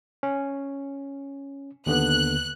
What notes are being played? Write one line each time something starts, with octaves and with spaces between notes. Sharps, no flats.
C#4
D#2 D3 B3 F#6